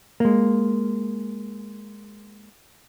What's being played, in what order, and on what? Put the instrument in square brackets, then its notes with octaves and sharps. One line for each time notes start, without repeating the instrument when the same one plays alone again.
[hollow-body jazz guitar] G#3 A#3